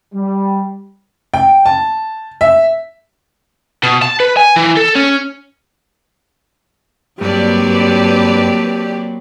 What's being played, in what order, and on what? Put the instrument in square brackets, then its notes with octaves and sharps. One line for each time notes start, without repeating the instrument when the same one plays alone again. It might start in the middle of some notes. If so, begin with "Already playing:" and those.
[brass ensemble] G3
[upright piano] G5
A5
E5
[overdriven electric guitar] B2
A5
B4
G#5
E3
A4
C#4
[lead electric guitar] G2 [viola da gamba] F#3 A#3 C4 [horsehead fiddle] G4 [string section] B4 D5 A5